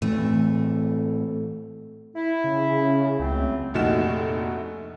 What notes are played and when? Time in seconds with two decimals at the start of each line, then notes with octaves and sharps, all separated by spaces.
0.02 A2 E3 A3 C4
2.16 E4
2.44 C#3
3.19 C#2 F#3 A3 C4
3.74 F1 A#1 A3 D#4 F#4 E7